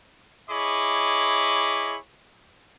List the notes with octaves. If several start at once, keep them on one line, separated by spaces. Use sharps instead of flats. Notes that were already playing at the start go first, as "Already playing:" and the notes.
E4 G#4 C#5 D#5 B5 D6